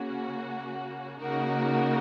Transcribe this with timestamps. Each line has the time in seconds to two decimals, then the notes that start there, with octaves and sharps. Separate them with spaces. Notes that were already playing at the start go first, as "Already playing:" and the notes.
Already playing: C#3 A#3 C#4 F#4
1.20 C#3 A#3 D#4 F#4 A#4